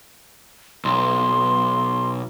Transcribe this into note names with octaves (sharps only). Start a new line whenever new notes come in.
B1 C6